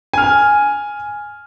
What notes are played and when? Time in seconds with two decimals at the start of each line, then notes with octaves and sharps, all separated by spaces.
0.13 G#5 F6